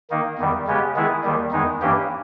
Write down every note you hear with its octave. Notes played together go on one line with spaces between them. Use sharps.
D#3 A#3 D#4
E2 D#3 G3
C#3 G#3 B3 G4
D#3 G#3 B3 E4 G#4
D#2 D#3 G3
E2 D#3 G#3 D#4
G2 E3 A#3 C#4 G4